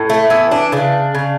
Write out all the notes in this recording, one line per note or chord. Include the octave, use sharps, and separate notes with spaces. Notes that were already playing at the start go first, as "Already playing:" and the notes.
Already playing: A2
A3
E3 B3
D4
C#3 D4
C#3